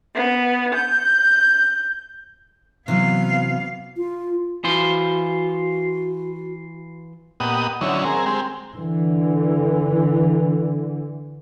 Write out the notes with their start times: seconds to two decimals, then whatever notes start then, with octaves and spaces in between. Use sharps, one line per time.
0.14 B3
0.74 G6
2.88 C3 E3 F#3 B3 F5
3.97 F4
4.64 E3 F4 F#4 C5
7.40 A#2 B3 G4 D#5 F#5 D#6
7.81 D3 D#3 F#3 C#4 E4 C#5
8.05 C4 G#4 A#4
8.26 G#3 C4 G4
8.74 D3 E3